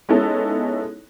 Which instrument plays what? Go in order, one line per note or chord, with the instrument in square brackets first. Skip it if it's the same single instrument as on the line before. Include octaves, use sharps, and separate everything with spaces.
[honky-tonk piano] G#3 B3 C#4 D#4 E4 A4